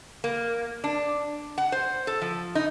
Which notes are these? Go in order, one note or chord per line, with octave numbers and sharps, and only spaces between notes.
A#3
D4
F#5
C5
A4
F3
D#4